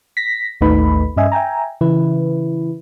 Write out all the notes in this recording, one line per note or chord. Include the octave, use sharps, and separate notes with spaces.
A#6 B6
A1 D#2 A3 D#4 B4 B5
G2 C#4 D#5 E5 G#5
E5 G5 G#5 A#5
C#3 E3 E4 B4